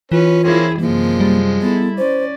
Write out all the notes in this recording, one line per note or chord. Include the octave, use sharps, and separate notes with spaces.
E3 C#4 F4 B4
A#3 C4 C#4 E4 G#4
F#2 C3 F3 G#3 A#3
G3
B3 E4 A4
C#4 C5 D5